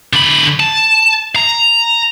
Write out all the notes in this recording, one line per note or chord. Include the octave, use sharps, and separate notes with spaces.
D3 B5
A5
A#5